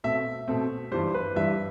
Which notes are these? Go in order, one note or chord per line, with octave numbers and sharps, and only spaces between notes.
B2 A3 C4 E5
B2 A3 C4
G2 E3 G3 C5
B4
G2 E3 G3 E5